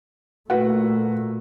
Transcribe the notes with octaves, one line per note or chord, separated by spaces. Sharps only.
A#2 A3 F#4 B4 F#5